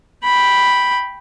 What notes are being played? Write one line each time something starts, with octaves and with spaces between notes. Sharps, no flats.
G5 B5